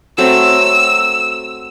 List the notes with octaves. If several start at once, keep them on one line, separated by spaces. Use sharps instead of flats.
F#3 A3 C4 E6